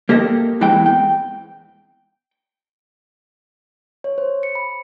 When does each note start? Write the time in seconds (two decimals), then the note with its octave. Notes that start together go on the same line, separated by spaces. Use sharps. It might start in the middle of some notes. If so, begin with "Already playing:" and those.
0.09 A#3 G4 A4 D#5
0.61 E2 E3 G#3 C4 G5
0.86 G5
4.04 C#5
4.18 C5
4.43 C#7
4.55 B5